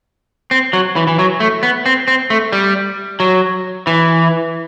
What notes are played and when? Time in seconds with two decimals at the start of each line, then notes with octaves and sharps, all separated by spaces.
0.51 C4
0.73 F#3
0.96 E3
1.07 E3
1.19 F#3
1.40 A3
1.63 B3
1.86 C4
2.08 C4
2.30 A3
2.52 G3
3.20 F#3
3.87 E3